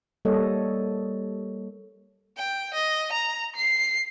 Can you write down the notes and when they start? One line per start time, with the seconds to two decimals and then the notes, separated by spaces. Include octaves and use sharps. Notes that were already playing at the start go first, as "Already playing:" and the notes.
0.25 G3 A#3 A4 C#5 D#5
2.37 G5
2.74 D#5
3.12 A#5
3.56 C7